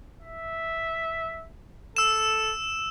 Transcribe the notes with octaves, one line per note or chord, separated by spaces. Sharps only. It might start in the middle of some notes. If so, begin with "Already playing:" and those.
E5
A4 E6 E7